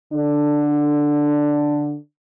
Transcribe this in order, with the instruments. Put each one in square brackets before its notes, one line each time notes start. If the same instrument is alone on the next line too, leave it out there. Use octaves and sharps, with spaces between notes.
[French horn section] D3 D4